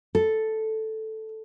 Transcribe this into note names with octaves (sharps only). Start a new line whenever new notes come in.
A4